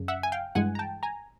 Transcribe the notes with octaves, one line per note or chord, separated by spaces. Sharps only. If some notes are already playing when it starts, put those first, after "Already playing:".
Already playing: F#2 C#3
E5 F#5
G#5
F5 G5
G2 E3 G#3 F#5 G#5
A#5
G5 A5
G#5 A#5